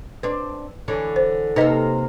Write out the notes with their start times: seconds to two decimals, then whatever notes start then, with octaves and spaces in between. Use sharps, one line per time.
0.23 C4 D4 B4
0.88 D3 E3 C#5
1.16 C5
1.56 C3 A#3 D#4 A4 B4 D#5